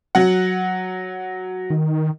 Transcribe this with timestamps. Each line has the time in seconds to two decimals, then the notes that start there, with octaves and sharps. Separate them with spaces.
0.15 F#3 F#5
1.70 D#3